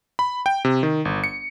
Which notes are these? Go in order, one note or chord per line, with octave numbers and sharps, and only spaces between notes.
B5
G5
C3
D#3
G1
C#7